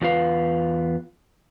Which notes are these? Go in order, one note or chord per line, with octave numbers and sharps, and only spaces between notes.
E2 F4 B4 F5